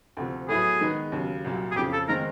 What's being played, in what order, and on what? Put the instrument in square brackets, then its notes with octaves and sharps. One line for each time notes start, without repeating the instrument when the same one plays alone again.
[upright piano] D2 C3 F3
[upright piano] A2 F#3 B3 E4 [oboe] G#4
[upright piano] D#3 G#3 B3 D#4
D#2 C#3 F#3
C2 A#2 F#3
[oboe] G#4
[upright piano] F2 [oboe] G4
[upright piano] C#3 F3
[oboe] A4
[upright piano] D#3 G#3 C4 D#4 [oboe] A#4